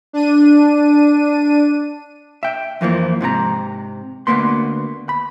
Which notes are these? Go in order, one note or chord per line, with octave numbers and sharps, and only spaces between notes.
D4 D#7
E5 G5
F2 E3 F3 A#3
G#2 C3 G#4 A#5
D2 G2 A#3 B3 C6
B5